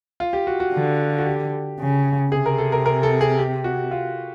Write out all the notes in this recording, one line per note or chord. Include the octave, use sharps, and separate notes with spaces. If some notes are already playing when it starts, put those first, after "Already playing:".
F4
G4
F#4
F#4
D3
F#4
G4
C#3
C3 G#4
A#4
A4
A#4
A#4
A4
G#4
G4
F#4
F4